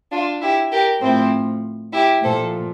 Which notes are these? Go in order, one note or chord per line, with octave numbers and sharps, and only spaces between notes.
D4 F4
E4 G4
G4 A#4
A2 F3 C4 E4
E4 G4
A#2 F3 A4 C5